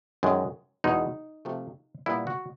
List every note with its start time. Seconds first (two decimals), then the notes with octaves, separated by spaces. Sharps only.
0.23 F#2 D#3 G#3
0.84 E2 B2 G#3 D#4
1.45 C3 F3 A3
2.06 A#2 G3 B3 E4
2.27 F#4